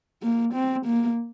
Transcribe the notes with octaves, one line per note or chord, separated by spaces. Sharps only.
A#3
C4
A#3